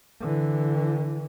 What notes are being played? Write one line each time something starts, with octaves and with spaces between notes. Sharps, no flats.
D3 E3